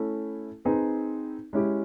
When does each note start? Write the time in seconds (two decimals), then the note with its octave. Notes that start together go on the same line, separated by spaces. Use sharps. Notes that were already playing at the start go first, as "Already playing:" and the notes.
Already playing: A3 C#4 E4 A4
0.65 C4 D#4 G#4 B4
1.53 G#3 C#4 E4 G4